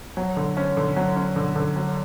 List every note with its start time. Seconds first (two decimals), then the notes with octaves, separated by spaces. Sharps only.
0.17 F#3
0.37 D3
0.57 C#4
0.77 D3
0.96 F#3
1.16 C#4
1.36 D3
1.56 D3
1.76 F#3